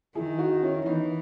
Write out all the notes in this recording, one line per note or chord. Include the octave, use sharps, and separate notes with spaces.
D#3 E4 G#4
D#4 F#4
C#4 E4
E3 B3 D#4